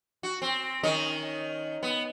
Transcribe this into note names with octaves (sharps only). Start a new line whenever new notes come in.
F#4
C4
D#3 C#4 D#5
B3